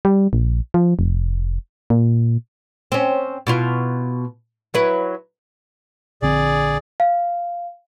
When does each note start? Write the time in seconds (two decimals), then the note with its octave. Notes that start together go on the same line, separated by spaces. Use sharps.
0.05 G3
0.33 A#1
0.74 F3
0.99 F1
1.90 A#2
2.92 C4 C#4
3.47 B2 E4 F4
4.74 F#3 E4 B4
6.22 A#1 D3 C4 G#4 D5
7.00 F5